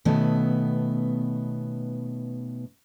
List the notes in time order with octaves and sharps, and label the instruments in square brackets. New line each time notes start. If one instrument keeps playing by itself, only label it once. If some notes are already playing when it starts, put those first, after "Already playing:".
[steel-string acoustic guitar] B2 D#3 A3 B3 C#4